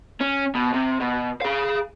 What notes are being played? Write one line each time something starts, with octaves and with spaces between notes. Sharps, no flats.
C#4
B2
C3
B2
G#4 F5